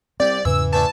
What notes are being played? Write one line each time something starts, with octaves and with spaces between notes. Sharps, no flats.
C2 C4 G4 D5
E2 G#2 C#3 E3 E6
E3 A3 D4 A5